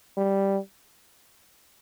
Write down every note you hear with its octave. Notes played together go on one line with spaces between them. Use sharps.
G3